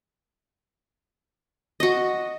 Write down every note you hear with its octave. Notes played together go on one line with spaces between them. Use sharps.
F#4 D#5